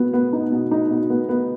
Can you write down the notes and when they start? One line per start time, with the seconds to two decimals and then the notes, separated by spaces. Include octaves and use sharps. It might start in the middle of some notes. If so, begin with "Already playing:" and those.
Already playing: B2 B3
0.13 B3
0.33 D#4
0.52 B2
0.71 D#4
0.90 B2
1.10 B3
1.29 B3